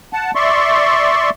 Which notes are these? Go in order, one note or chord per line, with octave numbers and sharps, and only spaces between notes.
F#5 A5
D5 E5 C6 C#6